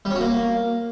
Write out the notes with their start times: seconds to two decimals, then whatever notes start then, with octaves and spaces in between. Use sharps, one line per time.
0.05 G3
0.10 C#4
0.15 F#4
0.20 A#3